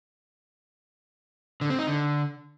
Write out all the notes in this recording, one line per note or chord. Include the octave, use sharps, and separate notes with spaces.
D3
C4
D#4
D3